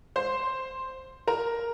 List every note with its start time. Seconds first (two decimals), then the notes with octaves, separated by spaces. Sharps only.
0.16 C5 C6
1.27 A#4 A#5